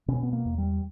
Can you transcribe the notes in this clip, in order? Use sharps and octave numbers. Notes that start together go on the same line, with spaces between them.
B2 C#4
B3
A#3
E2
G3